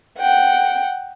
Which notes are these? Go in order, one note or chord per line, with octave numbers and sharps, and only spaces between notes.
F#5 G5